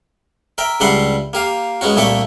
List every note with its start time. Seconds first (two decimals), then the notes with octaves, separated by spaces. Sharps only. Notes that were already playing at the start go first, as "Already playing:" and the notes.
0.58 A#4 E5 G5
0.80 C#2 G3 D4 E5 F#5 C6
1.33 A#3 G4 F5
1.81 G#3 B3 C#4 F#4
1.96 C2 A#2 A3 G4 E5 C#6